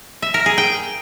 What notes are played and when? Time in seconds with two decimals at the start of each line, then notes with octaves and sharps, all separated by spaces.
0.22 E5
0.34 A#4
0.46 G#4
0.58 G5